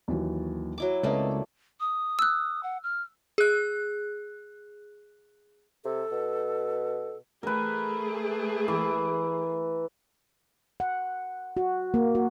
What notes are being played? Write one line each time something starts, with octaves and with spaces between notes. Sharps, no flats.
D#2 E3 F#3
F#3 E4 D6
C#2 A3 A#3 C4 B4 D5 D#5
D#6
E6 F#6
F#5
F6
G#4 F#6
C3 A4
B2
A3 G#4 A#4 B4
E3
F#5
F#4
A#3
F#4